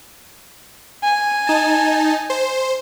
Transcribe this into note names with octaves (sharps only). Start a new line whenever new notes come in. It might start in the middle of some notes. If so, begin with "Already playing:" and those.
G#5
D#4 A5
C5